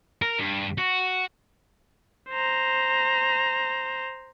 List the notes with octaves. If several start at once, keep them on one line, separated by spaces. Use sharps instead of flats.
A#4
G2
F#4
C5 A#5